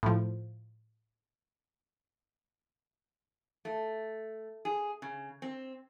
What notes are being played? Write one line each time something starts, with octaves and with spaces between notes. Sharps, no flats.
A2 F3
A3
G#4
C#3
C4